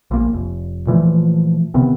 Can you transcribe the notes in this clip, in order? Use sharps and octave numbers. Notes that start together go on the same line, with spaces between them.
A#1 A#3
F1
A#2 E3 F3 A3
C3 D#3 B3 C4